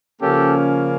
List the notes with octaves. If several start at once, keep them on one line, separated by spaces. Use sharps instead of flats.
C#3 F3 A#3 C#4 G4 A4